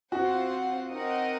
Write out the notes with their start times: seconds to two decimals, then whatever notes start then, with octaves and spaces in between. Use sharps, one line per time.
0.12 C4 F4 F#4 C5 F#5
0.91 C4 D#4 A#4 D#5 F#5